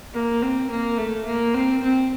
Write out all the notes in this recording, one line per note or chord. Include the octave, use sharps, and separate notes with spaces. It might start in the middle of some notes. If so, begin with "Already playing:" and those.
A#3
C4
A#3
A3
A#3
C4
C4